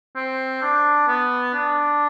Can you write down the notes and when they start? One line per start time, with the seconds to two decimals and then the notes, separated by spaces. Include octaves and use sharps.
0.16 C4
0.62 D4
1.08 B3
1.54 D4